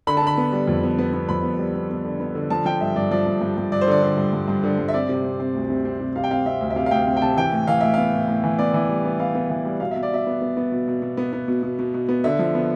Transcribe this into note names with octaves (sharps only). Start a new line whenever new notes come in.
D3 B5
A5
D3 B5
B3
G3
F2
B3
B3
B3
F2 B5
B3
G3
B3
B3
D3
B3
D3
F3 A5
F3 G5
G2 E5
G2 D5
F3 D5
G2
G2
G2
G2 D5
C5
D3 D5
D3
G2
G2
G2
D3
G2
E5
C4 D5
C3
C4
C4
D2
C3
C4
C3
C3 F5
G5
C4 F5
C4 E5
D2
E5
C3 F5
F5
D2 G5
C4
G5
C3 A5
E3 G5
A2
E3 F5
A2 E5
B3 F5
A2
A2
E3
B3 D5
E3
G3
B3
B3 F5
B3
E3
G3
B2 F5
B2 E5
D5
B2 E5
B3
B3
B3
B2
B2
B2
B3
B3
B2
B2
B2
B2
B3
D3 E5
F3
B3